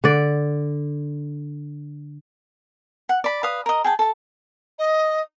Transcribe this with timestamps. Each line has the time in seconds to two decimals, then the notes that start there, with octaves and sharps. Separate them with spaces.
0.04 D3 D5
3.09 F#5
3.24 D5 B5
3.43 B4 F5 D#6
3.66 A#4 D#5
3.84 G#4 G5 A5
3.99 A4 A5
4.78 D#5